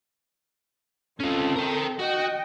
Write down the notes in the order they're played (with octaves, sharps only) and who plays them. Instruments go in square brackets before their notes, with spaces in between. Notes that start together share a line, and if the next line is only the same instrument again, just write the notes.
[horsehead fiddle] C4 A4 [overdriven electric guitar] C#4 F4
[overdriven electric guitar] A#4 G5
[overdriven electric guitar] F#4 [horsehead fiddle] D#5 G5